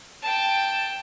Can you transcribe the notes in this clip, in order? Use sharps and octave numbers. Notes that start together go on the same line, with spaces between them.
G5 A5